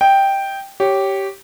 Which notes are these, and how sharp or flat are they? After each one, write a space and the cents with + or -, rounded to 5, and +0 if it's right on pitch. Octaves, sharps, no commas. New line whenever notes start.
D#5 +20 G5 +0
G4 -10 C#5 +0